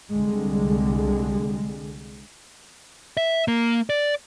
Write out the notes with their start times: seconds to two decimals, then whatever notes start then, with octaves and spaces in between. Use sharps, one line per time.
0.10 C2 D3 G3 G#3
3.17 E5
3.48 A#3
3.90 D5